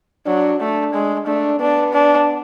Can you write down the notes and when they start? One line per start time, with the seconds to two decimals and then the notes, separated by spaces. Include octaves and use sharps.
0.26 F#3 D4
0.60 A3 D4
0.94 G#3
1.26 A3 D4
1.60 B3 D4
1.93 D4